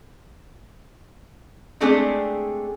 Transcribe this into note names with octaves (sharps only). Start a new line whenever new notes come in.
G#3 A3 C4 D4 G4 G#4